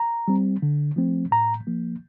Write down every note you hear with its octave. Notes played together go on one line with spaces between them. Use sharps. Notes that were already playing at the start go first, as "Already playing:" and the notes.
Already playing: A#5
G3 C4
D3
F3 A3 C4
A2 A#5
F3 A#3